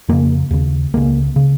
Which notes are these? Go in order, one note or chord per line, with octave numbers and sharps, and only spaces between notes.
F2 C#3 A#3
D#2 C#3
C#2 C#3 A#3
C#3